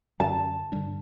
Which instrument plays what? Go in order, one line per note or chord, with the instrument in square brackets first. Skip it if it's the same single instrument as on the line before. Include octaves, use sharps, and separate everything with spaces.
[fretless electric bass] F#2 D3 F#3 C#4 [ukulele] A5
[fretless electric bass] G2 D3 G3 D4